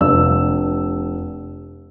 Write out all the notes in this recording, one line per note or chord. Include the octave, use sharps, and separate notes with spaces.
F1 D4 E6